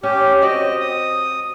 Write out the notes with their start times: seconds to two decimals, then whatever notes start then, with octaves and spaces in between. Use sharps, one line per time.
0.03 C#4 G4
0.42 C4 F#4 D5 D#5
0.81 D#6